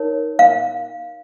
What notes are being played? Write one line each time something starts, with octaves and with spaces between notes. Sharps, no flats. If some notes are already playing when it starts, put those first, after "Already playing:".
Already playing: D#4 A#4 C#5
F5